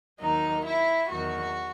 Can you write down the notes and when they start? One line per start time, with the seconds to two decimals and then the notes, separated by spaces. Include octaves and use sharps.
0.20 D#2 D#3 F#3 D#4
0.65 E4
1.09 E2 D#3 F#3 F#4